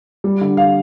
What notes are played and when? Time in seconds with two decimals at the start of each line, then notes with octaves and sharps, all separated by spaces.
0.24 G3
0.41 D3
0.57 F5